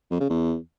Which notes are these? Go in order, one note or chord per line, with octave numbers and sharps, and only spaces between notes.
F2
C#3
E2